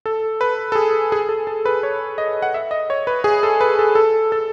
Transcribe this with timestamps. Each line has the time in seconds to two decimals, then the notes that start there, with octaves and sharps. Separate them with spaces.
0.06 A4
0.41 B4
0.72 A4
0.75 G#4
1.12 G#4
1.29 A4
1.47 A4
1.65 B4
1.83 C#5
2.18 D#5
2.42 F#5
2.54 E5
2.71 D#5
2.90 C#5
3.07 B4
3.24 G#4
3.43 A4
3.61 B4
3.79 A4
3.95 A4
4.32 A4